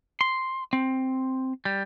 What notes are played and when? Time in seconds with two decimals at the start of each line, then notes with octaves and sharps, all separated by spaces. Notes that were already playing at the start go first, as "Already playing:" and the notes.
0.21 C6
0.73 C4
1.65 G3